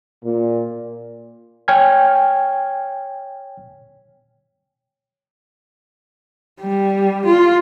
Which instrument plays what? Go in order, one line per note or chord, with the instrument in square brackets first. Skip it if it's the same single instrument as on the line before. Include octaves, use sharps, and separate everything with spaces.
[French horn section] A#2
[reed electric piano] C#5 G5 G#5 F6 G#6
[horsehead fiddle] G3
F4